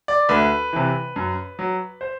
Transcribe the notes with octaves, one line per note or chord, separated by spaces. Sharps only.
D5
D2 B4
C3 E3
F#2
F#3
C5